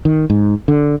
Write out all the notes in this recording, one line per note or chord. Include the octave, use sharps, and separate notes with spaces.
D#3
G#2
D3